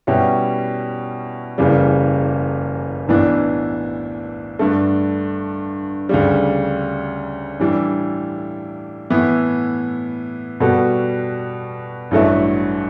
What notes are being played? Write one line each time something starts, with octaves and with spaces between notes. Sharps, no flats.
B2 G3 C#4 E4 G4
F#1 E2 C#3 G3
B1 A2 E3 B3 D4
G2 D3 A3
D2 C#3 G3
A2 E3 G3 D4
A2 E3 B3 E4
B2 G3 B3 F#4 A4
A1 G2 F#3 A3 E4